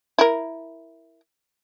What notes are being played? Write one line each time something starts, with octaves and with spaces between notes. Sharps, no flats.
E4 A#4